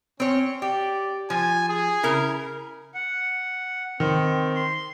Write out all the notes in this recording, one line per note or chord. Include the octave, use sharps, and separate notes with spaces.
C4 C#4 C#5
G4 D5
F3 G#5
G#4
C#3 E4 A#4
F#5
D#3 C4
C6